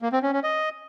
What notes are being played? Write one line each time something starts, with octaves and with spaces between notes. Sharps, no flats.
A#3
C4
C#4
C#4
D#5